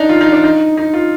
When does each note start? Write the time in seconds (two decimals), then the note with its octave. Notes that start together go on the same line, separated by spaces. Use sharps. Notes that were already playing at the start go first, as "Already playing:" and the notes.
Already playing: D4 D#4
0.09 F4
0.21 D#4
0.32 D4
0.44 D#4
0.77 D#4
0.94 F4